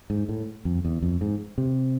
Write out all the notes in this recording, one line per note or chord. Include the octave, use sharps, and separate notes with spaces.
G#2
A2
F2
E2
F2
G#2
C3